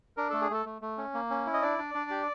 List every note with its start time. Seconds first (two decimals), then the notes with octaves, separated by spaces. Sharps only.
0.17 D4 A#4
0.30 A3 A4
0.41 G#4
0.50 A3 A4
0.66 A3
0.82 A3
0.98 C#4
1.14 A#3
1.30 C#4
1.46 E4
1.53 D#5
1.62 D4 D5
1.78 D4
1.94 D4
2.10 G4